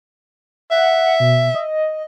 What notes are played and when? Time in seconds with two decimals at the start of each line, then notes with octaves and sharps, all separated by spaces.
0.71 E5 F#5
1.20 B2
1.55 D#5